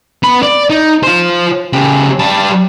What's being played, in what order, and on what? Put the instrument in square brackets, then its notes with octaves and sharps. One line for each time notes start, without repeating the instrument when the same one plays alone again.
[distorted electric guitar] B3 B5
D5
D#4
F4 C5
C#3 G4
G3 A5